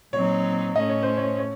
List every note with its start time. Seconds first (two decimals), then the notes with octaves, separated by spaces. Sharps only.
0.12 A#2 F#3 C4 D#4 C#5
0.75 A2 A3 C#4 D#5
0.89 C#5
1.03 C5
1.17 C#5
1.38 C#5